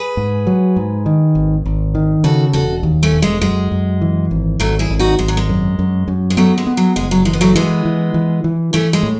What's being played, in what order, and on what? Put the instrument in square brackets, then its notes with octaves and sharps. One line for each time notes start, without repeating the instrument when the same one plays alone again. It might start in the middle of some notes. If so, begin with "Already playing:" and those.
Already playing: [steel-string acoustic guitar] G#4 B4
[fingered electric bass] G#2
F#3
G#2
D#3
G#1
G#1
D#3
[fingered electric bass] C#3 [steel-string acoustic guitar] F#4 A4
[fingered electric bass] E1 [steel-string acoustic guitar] F#4 A4
[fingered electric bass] D#2
[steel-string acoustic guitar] A3 C#4
[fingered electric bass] E1
[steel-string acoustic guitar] G#3
[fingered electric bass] F#2 [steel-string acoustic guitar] G#3
[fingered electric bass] F#2
E3
G#1
[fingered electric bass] G#1 [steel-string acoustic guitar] F#3 A3
[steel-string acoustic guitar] E4 G#4
[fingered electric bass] G#1
[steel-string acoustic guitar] D#4 F#4
[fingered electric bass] G#1 [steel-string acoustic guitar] G#3
[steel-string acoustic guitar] F#3
G#3
[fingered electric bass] F#2
F#2
F#2
[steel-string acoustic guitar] G#3
[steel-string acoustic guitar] F#3 A3 [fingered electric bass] B3
[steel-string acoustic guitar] G#3
[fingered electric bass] B3
[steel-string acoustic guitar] F#3
[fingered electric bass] F#1 [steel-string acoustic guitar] G#3
[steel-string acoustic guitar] F#3
[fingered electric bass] E3 [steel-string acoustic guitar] G#3
[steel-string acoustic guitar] B3
F#3 A3
[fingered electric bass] E3 [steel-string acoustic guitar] G#3 B3
[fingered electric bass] E3
E3
E3
[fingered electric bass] E3 [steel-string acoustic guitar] A3 C#4
[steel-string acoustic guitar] G#3
[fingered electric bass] A2